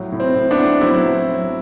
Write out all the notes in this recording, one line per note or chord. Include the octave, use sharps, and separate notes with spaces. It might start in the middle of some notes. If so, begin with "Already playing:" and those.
Already playing: A2 F#3
A2
C4
A2
B3 D4
A2
F#3 C4 E4
F#3
F#3